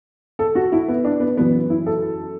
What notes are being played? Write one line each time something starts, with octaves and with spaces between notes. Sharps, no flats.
A4
F#4
E4
B3
D4
B3
F#2 E3 B3
E4
A4